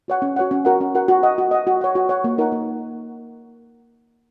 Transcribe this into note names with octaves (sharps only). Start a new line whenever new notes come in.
F#4 C#5 F#5
C#4
F#4 C#5 F#5
C#4
F#4 A#4 F#5
C#4
F#4 A#4 F#5
F#4
D#5 F#5
F#4
D#5 F#5
F#4
C#5 F#5
F#4
C#5 F#5
A#3
D#4 A#4 F#5
A#3